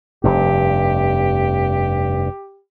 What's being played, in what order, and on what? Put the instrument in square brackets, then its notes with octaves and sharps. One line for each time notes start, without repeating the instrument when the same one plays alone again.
[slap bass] F1 G2 [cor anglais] G4